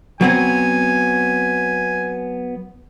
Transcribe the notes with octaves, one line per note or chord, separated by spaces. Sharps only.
F#3 B3 C4 G#5